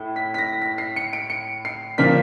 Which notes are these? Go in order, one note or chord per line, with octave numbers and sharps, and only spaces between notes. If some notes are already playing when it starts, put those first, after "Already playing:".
Already playing: A2 E4
B6
B6
A#6
B6
C7
C#7
D7
C#7
C7
A#2 F3 A#3 D4 F4 B6